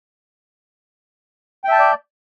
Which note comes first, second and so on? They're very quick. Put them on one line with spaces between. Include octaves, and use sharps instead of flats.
G5 E5 A5 G6 D5